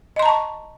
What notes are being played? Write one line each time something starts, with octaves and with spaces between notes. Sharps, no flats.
D#5 A5 A#5 C6 C#6